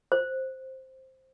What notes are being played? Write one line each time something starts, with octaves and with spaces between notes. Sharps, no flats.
C5